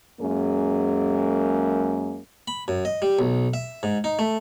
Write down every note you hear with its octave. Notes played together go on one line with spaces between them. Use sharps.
F#2 G#3 A#3 C#4 G#4
B5
F#2
D#5
G3
B1
E5
G#2
D#4
A3